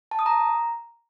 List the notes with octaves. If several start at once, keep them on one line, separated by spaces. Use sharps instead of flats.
A5
D#6
A#5